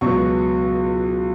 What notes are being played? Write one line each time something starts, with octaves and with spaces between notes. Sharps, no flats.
C#2 B2 F#3 B3 C#6